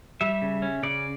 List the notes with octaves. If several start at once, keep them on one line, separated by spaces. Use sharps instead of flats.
G3 E5
C#3
C#4
C#3 D5